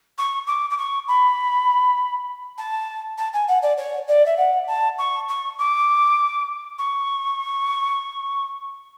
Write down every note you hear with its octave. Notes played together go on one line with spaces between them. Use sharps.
C#6
D6
D6
C#6
B5
A5
A5
G#5
F#5
D5
C#5
D5
E5
F#5
A5
C#6
C#6
D6
C#6